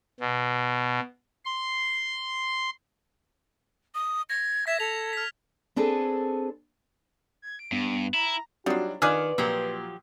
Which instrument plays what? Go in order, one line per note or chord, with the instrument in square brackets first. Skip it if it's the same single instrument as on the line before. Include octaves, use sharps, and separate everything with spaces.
[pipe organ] B2
C6
[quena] D#6
[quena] G#6 [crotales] A#6
[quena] E5 [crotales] G#6 B6
[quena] A4 [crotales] F7
[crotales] F6 B6
[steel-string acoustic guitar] C4 D4 G#4 A4 B4
[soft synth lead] G#6
D7
[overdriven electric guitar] G2 [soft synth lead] B3
[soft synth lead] B3
[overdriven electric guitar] E4 [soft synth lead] A#5
[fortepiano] F#3 G3 D4 [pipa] D#4 F4 [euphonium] F#4
[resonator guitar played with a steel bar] D#3 [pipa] F4 G#4 D5 [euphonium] B4 [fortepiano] G#5 F6 F#6
[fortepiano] A#2 [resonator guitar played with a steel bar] F3 F#3 G4